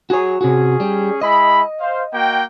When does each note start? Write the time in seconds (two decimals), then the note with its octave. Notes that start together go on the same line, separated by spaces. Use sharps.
0.10 F#4 G#4 C#5
0.41 C3 C#4 F#4 G#4
0.80 G3
1.21 G#3 E4 D#5 B5
1.80 C5 F5
2.13 A#3 F#4 G5